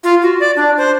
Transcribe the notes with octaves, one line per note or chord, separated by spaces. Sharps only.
F4
F#4
D5
D4
C5